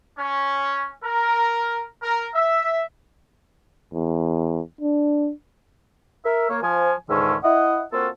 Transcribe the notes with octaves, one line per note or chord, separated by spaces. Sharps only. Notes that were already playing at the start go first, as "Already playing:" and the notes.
C#4
A#4
A#4
E5
E2
D4
A#4 E5
A#3 C#5
F3 G#5
C#2 G#2 D3 D#3 C#4 E5
E4 D#5 F#5
A#3 C4 F4 F#4 A4